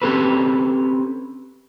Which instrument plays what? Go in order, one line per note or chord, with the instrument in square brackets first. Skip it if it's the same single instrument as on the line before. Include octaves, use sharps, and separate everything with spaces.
[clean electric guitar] C4 C#4 G4 A4 B4